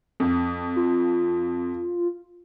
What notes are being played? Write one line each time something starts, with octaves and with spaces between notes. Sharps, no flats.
F2
F4